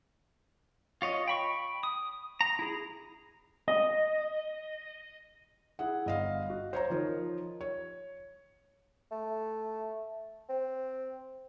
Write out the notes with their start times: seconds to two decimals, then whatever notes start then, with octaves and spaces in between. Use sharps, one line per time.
1.02 F4 C#5 D#5
1.28 G5 B5 C#6
1.83 D#6
2.41 A#5
2.59 E4 G#4
3.68 D#5
5.79 E4 G#4 F#5
6.06 G1 D#5 F5
6.50 F#4
6.73 C5 C#5 A#5
6.90 F3 D#4 F4 A#4 C#5
7.61 C#5
9.11 A3
10.49 C4